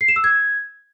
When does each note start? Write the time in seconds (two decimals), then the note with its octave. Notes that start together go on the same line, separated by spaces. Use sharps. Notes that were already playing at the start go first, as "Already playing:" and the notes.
0.01 C7
0.08 E7
0.16 E6
0.24 G#6